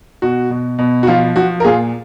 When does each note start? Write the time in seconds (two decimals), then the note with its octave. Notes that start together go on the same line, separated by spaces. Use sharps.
0.22 B2 F#4
0.50 B2
0.78 B2
1.03 F#4
1.07 F3 F4
1.36 F3 F#4
1.60 A#4
1.64 A#2 F4 G#4